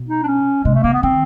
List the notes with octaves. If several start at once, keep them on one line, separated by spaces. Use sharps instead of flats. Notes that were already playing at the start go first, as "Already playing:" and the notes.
Already playing: B2
D#4
D4
C#4
C3 G#3
A3
C#3 A#3
B3
D#3 C4